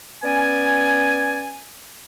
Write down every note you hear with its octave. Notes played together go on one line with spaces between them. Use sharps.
B3 C#4 D5 G#5